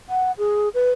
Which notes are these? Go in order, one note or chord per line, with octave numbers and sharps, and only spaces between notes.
F#5
G#4
B4